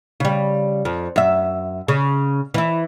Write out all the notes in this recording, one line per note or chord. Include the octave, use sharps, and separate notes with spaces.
C#3 G3
F2
F#2 E5
C#3
E3 E4